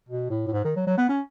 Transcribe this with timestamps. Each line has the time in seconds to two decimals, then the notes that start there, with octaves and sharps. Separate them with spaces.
0.09 B2
0.30 A2
0.47 A2
0.53 G#2
0.65 D#3
0.76 F#3
0.87 F#3
0.97 B3
1.09 C#4